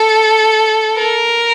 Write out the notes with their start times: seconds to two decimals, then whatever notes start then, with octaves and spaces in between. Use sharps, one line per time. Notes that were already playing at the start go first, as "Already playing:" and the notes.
Already playing: A4
0.97 A#4